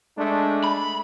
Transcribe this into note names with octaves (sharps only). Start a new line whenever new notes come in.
G#3 A3 D4
B5